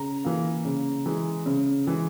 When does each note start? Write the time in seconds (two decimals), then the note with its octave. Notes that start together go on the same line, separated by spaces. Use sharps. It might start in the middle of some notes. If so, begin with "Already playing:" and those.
Already playing: C#3 A#5
0.25 E3 A#3
0.65 C#3
1.06 E3 G#3
1.46 C#3
1.86 E3 G#3